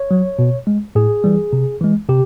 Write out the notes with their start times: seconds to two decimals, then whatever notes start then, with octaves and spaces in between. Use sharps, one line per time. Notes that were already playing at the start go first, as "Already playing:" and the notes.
Already playing: C#5
0.11 F#3
0.39 B2
0.67 G#3
0.95 A2 G#4
1.24 E3 G3
1.53 C3
1.81 E3 G#3
2.09 C3 G4